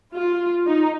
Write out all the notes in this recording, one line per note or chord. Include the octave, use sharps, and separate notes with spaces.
F4
D#4